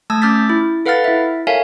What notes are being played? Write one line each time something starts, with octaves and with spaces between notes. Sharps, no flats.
A3 A5 D#6 E6 G#6
C#4 D6 F6 G6 A6 B6
E4
A4 B4 F5 F#5 F6 A6
E4 E5
A4 A#4 C#5 E5 F5 G#5